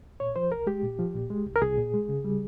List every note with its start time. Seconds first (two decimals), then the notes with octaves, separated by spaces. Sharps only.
0.20 A#2 C#5
0.36 F3 C5
0.51 C2 A#4
0.67 G#3 G4
0.83 A#2
0.99 F3
1.14 A#2
1.30 G#3
1.47 C2
1.56 A#4
1.62 C2 G#4
1.78 A#2
1.94 G#3
2.09 C#3
2.24 G3